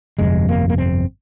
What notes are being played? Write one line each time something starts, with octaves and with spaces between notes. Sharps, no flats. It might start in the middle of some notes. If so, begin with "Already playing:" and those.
G1 F2 C3 G#3
A#3
A#3
C4